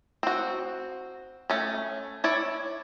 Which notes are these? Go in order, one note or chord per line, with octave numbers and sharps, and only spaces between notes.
C4 F#4
A3 C#4
E4 C#5 D5